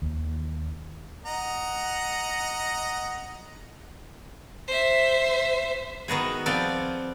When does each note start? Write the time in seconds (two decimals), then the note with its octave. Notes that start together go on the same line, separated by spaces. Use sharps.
0.02 D#2
1.26 D#5 F#5 A#5
4.68 C5 E5
6.08 D#3 B3 F#4 G#4
6.46 F3 B3 C4 D5